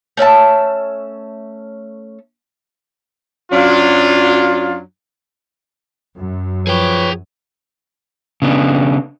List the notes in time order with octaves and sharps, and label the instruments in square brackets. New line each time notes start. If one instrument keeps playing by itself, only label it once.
[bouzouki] A3 C#4 E5 A5
[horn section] F#2 F#3 D4 F4
[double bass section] F#2
[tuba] F3 [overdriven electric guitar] G#4 G5 [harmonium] B4 C#5
[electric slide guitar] C#3 B3 D4